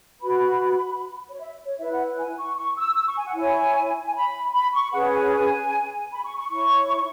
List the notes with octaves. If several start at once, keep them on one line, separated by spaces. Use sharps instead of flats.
F#4 B4 B5
C#5
E5
C#5
E4 B4 E5
F#5
G#5
C#6
C#6
E6
E6
C#6
G#5
F#5
E4 C#5 G#5
G#5
B5
B5
C#6
C#4 G#4 B4 F#5
G#5
G#5
B5
C#6
C#6
E4 C#5 C#6